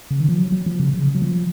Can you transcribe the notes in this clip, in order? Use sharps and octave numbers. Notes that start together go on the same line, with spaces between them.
C#3
D#3
F3
F#3
F#3
F3
C#3
C#3
F#3
F3